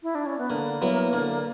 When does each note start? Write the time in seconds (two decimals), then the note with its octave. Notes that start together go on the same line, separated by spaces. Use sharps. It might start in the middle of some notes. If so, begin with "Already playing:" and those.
0.03 E4
0.15 D4
0.26 C#4
0.38 B3
0.50 D3 A#3
0.82 F#3 B3 E4
1.13 D3